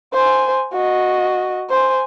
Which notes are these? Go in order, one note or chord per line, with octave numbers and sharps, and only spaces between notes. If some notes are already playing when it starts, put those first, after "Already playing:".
C5 G#5
F#4 D#5
C5 G#5